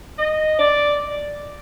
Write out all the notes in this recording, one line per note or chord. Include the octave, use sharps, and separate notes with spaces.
D#5
D5